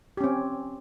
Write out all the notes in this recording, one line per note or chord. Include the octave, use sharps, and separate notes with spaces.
C4 C#4 G4